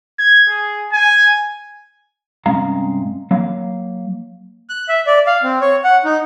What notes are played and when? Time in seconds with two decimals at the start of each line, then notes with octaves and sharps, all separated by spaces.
0.19 G#6
0.49 G#4
0.93 G#5
2.46 G2 C3 G#3 C#4 F5 A#5
3.31 F#3 A#3 F5
4.70 F#6
4.89 E5
5.07 D5
5.27 F5
5.43 C4
5.61 C#5
5.84 F#5
6.05 D#4